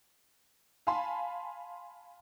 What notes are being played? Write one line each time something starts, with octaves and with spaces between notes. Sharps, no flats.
F5 G#5 A5 B5 C6